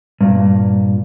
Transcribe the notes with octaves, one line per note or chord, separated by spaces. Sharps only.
G2 A#2